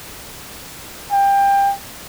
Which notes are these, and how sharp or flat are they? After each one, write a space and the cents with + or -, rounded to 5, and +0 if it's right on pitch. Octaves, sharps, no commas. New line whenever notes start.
G5 +25